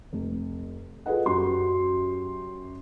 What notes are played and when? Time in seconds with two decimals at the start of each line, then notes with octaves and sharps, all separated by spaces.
0.13 F1
1.06 F4 G#4 A4 B4 D#5 F#5
1.26 F#2 F#4 G4 C6